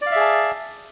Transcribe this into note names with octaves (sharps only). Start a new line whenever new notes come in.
G#4 D5 E5 F5 A5